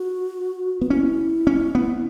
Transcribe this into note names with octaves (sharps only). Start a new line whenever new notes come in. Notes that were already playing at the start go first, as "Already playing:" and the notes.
Already playing: F#4
B3 F#4
C#4 E4
C#4
B3